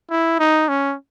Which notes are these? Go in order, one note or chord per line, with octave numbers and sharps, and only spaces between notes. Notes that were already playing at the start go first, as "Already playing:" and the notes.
E4
D#4
C#4